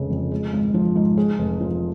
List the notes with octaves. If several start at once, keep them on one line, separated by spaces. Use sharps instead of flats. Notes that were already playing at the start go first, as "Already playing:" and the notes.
Already playing: F1 C#3 G#3
F2
G#3
G#1
F3
G#2
G#3
F1
F3